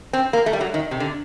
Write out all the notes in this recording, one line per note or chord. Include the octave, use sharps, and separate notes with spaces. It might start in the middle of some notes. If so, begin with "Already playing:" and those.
C4
A#3
A3
G3
F#3
D#3
C3
D3